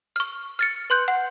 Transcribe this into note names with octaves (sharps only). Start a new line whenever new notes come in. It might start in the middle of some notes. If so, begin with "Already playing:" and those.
C#6 F6
F6 A6 C#7
B4 C6 F#6 G6
F#5